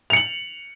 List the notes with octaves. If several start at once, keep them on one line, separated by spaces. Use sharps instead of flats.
C#7 F7 F#7